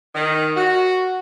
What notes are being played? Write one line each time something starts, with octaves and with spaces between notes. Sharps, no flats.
D#3
F#4